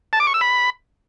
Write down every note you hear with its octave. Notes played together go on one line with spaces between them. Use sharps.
A5
D6
C#6
E6
B5